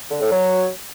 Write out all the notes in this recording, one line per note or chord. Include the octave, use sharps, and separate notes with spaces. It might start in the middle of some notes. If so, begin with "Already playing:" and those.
D3
A2
F#3